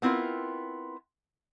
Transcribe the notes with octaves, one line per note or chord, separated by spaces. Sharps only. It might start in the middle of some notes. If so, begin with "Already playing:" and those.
B3 C4 E4 F4 A#4